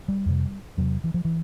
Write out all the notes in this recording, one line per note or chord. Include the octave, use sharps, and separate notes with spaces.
G3
F2 C3
E2 C3 F#3
E3
F3
E3